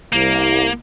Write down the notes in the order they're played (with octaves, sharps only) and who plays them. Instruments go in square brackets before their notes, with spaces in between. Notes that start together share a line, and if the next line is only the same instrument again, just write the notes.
[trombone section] C2 [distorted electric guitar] A#3